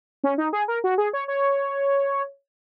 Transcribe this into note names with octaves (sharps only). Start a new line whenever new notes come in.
C#4
D#4
G#4
A#4
F#4
G#4
C#5
C#5